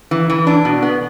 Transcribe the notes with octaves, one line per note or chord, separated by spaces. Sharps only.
E3
E3
D4
B2
B3